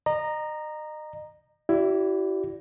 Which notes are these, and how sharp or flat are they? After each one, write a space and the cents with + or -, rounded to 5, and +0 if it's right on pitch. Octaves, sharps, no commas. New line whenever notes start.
D#5 -35 A#5 +0
E4 +15 G4 -45 D5 -10